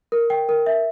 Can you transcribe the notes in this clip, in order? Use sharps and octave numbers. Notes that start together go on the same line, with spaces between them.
A#4
G5
A#4
E5